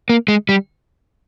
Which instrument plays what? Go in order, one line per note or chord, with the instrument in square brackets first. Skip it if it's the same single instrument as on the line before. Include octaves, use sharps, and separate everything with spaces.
[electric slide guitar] A#3
G#3
G3